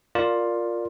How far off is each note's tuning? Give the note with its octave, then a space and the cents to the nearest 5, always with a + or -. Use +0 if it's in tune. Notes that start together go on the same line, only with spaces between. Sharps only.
F4 +10 A#4 -5 D5 +0